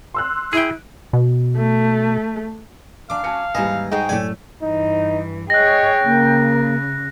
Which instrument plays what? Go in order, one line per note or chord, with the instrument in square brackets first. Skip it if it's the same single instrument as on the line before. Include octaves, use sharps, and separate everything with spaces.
[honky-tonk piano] C6 E6 F#6
[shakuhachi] E4 [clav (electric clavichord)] G#4 G5
[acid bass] B2
[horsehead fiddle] A3
[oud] F#2 D4 [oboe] F5 [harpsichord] D6
[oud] F#3 C#4 [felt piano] A5 C#7
[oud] D#2 G#2 E3 [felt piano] G3 B4 G#5 [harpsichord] D#5
[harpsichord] G#2 [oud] G#3 D#4 F#4 [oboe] G5
[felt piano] F#2 A2 [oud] A3 G4 D5 [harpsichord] G#5
[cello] G2 E3 [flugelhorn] D#4
[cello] G#4 C#5 [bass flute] D#5 [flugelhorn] G5 [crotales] F#6 A#6
[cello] C#3 [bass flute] A#3